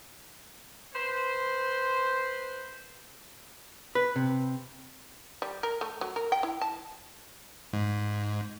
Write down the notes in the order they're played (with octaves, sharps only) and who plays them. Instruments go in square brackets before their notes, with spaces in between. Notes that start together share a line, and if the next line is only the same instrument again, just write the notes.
[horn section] B4 C5
[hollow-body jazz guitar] B4
C3
[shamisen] G3
A#4
A3
F#3
A#4
G5
E4
A5
[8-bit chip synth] G#2